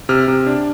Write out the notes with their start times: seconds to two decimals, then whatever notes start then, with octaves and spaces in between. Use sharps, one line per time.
0.09 C3 F6
0.28 C3
0.46 D4